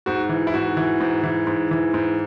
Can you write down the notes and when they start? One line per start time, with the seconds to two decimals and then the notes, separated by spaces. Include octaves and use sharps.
0.06 G#2 F#4
0.29 E3
0.47 E4
0.54 G#2 F#4
0.77 E3
1.00 G#2
1.23 E3
1.47 G#2
1.71 E3
1.94 G#2